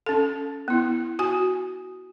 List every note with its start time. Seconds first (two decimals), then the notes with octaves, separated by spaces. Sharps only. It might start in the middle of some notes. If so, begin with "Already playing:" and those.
0.06 C#4 A4
0.68 B3 E4
1.19 F#4 G#5